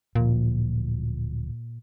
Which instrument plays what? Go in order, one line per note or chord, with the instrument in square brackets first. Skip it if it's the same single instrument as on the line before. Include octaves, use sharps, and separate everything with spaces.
[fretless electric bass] D1 F3 [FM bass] A#2